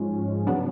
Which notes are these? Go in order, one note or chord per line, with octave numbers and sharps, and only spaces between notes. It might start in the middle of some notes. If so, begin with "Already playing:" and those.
Already playing: G#2 F3 G#3 C#4
C#3 F#3 B3 D4